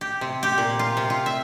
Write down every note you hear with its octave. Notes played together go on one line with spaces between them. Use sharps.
G4
C3
G4
A#2
F4
C3
F4
E5